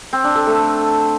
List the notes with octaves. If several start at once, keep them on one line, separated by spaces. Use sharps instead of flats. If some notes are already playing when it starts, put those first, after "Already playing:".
C4
D4
A4
A3